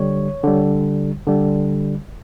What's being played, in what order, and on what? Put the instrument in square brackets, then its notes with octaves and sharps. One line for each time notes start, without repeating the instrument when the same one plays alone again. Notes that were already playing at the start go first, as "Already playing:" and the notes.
Already playing: [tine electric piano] D3 G3 C#5
D3 G3
D3 G3